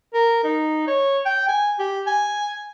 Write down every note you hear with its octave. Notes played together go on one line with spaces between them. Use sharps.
A#4
D#4
C#5
G5
G#5
G4
G#5